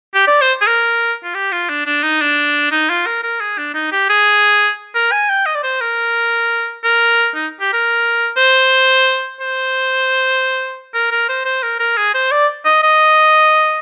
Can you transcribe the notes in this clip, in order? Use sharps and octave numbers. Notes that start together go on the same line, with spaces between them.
G4
D5
C5
G#4
A#4
F4
G4
F4
D4
D4
D#4
D4
D#4
F4
A#4
A#4
G#4
D4
D#4
G4
G#4
A#4
G#5
G5
D#5
D5
C5
A#4
A#4
D#4
G4
A#4
C5
C5
A#4
A#4
C5
C5
A#4
A#4
G#4
C5
D5
D#5
D#5